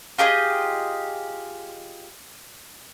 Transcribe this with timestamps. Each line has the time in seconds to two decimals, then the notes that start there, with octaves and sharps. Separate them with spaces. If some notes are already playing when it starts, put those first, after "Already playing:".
0.18 F4 G4 G#4 D#5